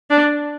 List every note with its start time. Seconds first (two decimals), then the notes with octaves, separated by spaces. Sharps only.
0.10 D4